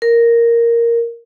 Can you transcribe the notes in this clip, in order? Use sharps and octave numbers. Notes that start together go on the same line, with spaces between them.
A#4